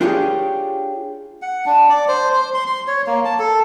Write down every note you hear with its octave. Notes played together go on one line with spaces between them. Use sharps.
D4 F4 G4 G#4 C#5
F#5
D4
D5
C5
C5
C6
C6
C#5
A#3
A5
A4